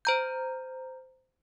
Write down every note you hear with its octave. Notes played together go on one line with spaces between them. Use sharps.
C5 A#5 G6